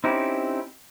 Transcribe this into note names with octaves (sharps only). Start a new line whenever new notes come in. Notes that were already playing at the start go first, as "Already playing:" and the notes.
C4 C#4 D#4 E4 G4